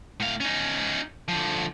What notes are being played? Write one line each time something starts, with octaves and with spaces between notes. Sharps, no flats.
A2 F5
C#4 D#4
D3 F3